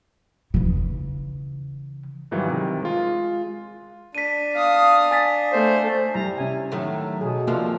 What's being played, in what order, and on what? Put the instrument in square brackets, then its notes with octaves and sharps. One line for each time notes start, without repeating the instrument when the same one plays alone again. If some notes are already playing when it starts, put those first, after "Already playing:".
[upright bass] C#3 E3
[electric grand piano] G#2 D#3 E3 F#3 G3 F5
C3 D#3
G#3 F4
[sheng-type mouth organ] D4 [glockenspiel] B6 D#7
[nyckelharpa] F5 D#6
[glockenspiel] G#5 A6 B6
[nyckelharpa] A3 [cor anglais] C5
[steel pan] G3 E4 A#5
[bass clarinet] C3 [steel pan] C#4 G#5
[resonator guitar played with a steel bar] A2 D#3 A3 [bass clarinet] F#3
[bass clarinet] B2 [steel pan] G#4
[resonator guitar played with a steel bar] C3 F3 G3 [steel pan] A#3 A4 D5